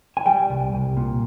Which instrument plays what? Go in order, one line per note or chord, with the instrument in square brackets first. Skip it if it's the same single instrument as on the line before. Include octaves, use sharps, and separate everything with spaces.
[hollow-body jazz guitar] G#5
G3 G5
C2
C2
A#2